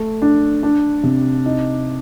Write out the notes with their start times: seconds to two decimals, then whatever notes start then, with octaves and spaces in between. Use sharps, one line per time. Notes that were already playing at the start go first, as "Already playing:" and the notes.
Already playing: A3
0.22 D4
0.63 D4
1.03 C3
1.46 D#4